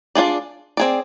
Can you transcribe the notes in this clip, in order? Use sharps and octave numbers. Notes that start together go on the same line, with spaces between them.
D4 F4 G#4 D5
C4 G#4 D5